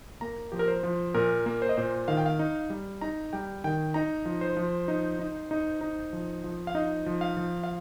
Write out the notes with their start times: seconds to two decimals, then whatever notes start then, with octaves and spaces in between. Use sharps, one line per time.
0.21 A#3 A#5
0.52 F3 G4
0.59 A#4
0.68 C5
0.83 F3
1.14 A#2 A#4
1.46 A#3
1.62 C5
1.69 D#5
1.77 A#2 C5
2.08 D#3 F5
2.17 G5
2.26 F5
2.39 D#4
2.70 G3
3.01 D#4 A#5
3.33 G3 G5
3.64 D#3 G5
3.94 D#4 A#5
4.25 F3
4.41 C5
4.57 F3
4.88 D#4
5.19 D#4
5.51 D#4
5.81 D#4
6.13 F3
6.44 F3
6.67 F5
6.75 D#4 D#5
7.06 F3
7.21 F5
7.37 F3
7.64 F5